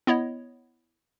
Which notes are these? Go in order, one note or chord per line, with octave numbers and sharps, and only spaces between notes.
B3 E4 C#5 D#5